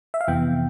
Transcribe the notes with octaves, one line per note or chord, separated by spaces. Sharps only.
E5
F5
F2 C3 E3 B3 G5